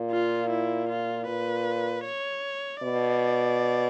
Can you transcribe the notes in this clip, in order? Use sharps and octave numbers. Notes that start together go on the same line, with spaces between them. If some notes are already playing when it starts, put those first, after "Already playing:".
Already playing: A#2
F4
E4
F4
A#2 B4
C#5
B2 D5